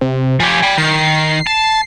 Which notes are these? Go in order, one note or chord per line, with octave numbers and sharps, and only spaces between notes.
C3
F3 G4 G#5
G5 B5
D#3 C7
A5